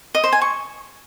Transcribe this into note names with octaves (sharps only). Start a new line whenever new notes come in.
D#5
C5
G#5
C#6